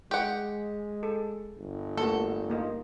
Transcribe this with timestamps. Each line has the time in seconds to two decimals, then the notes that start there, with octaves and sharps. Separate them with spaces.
0.11 G#3 G4 G#4 F#5
1.03 A4
1.57 G1
1.97 A3 A#3 F#4 A4
2.50 A#3 D#4 F4